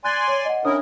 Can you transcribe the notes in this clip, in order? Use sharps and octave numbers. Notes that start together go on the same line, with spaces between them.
D5 G#5 C6 F#6 A6
C#5
D#5 F#5
C#4 D4 E4 A#4 C#5 D#6